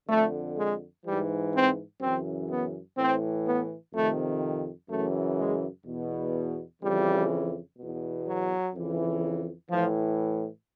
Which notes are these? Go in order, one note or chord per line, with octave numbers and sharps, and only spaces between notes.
F2 D3 A3
G#3
G#2 E3 G3
C4
F#2 C#3 E3 C4
B3
A2 E3 C4
B3
F2 C3 D#3 A3
F#2 C#3 E3 A3
G#3
E2 B2
F2 C#3 E3 G3
E2 B2
F#3
F2 C#3 E3
A2 E3 F3